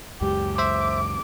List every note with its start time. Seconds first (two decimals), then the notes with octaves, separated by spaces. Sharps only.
0.21 C#2 F#2 G#3 G4
0.58 C5 E5 D6